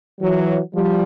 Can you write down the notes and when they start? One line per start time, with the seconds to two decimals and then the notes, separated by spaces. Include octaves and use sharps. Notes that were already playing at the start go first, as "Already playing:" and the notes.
0.20 E3 F#3
0.75 F3 G3